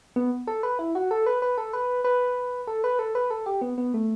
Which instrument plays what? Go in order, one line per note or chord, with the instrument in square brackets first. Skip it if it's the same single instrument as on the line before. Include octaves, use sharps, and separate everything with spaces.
[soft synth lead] B3
A4
B4
E4
F#4
A4
B4
B4
A4
B4
B4
A4
B4
A4
B4
A4
G4
B3
B3
A3